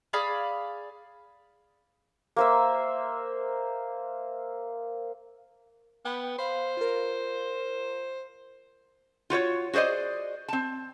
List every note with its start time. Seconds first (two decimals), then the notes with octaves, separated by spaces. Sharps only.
0.13 G#4 D5 F5 B5
2.36 A#3 C5 E5
6.05 B3 G5 B5
6.38 C5 F5 B5
6.77 F4 A#4
9.30 F4 F#4 C5 C#5
9.73 F#4 G#4 C5 D5 D#5
10.48 C4 A5